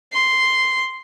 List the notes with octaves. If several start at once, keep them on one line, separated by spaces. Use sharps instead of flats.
C6